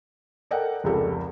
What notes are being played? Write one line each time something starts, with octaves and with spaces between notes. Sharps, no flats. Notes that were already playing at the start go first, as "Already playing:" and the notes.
A4 A#4 D5 D#5 F#5 G5
F1 C#2 F3 G4 A4 A#4